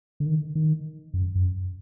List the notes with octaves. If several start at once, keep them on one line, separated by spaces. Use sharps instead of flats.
D3
D#3
D#3
F#2
F#2